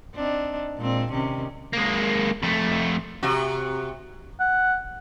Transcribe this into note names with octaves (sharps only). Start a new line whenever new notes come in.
C4 D4 D#4
A#2 G#3 C4
C3 D#3 C#4
G#3 A#3
F2 A3
C3 F#4
F#5